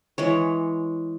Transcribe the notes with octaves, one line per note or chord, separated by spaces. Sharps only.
E3 G#3 C#5